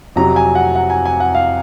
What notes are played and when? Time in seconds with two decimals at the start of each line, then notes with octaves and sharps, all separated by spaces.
0.16 F2 C3 F#3 A#5
0.36 G#5
0.55 F#5
0.76 F#5
0.90 G#5
1.05 G#5
1.20 F#5
1.35 F5